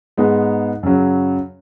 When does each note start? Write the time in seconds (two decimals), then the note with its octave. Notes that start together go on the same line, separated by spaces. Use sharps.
0.17 G#2 G#3 B3 D#4
0.83 F#2 C#3 F#3